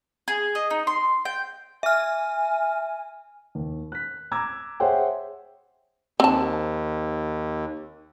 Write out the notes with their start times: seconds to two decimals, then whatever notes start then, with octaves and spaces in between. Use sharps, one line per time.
0.28 G#4
0.55 D#5
0.70 D#4
0.87 C6
1.25 G5
1.83 E5 G#5 F6
3.55 D#2
3.92 F#6 B6
4.32 A#5 D6 E6 G#6
4.80 G#4 C5 C#5 E5 F#5 G5
6.20 D#2 C4 A5